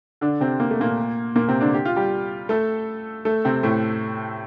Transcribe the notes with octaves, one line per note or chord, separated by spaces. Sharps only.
D3 D4
C3 C4
A#3
A3
A#2 A#3
A#2 A#3
C3 C4
D3 D4
G4
F4
G3 G4
A3 A4
A3 A4
C3 C4
A2 A3